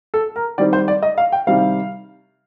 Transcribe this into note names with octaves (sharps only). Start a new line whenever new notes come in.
A4
A#4
D#3 G3 C4 D5
C5
D5
D#5
F5
G5
C3 D#3 G3 C4 F5